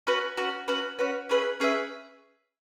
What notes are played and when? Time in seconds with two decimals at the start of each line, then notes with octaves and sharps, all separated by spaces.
0.07 C#4 F#4 B4
0.37 C#4 F#4 B4
0.68 C#4 F#4 B4
0.99 C#4 F#4 B4
1.29 C#4 G#4 B4 E5
1.60 C#4 G#4 B4 E5